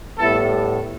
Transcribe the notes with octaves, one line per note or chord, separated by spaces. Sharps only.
A2 G3 B3 E4 A4